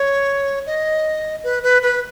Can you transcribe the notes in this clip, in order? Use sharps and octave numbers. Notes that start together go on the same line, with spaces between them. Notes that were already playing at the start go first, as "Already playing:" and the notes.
Already playing: C#5
D#5
B4
B4
B4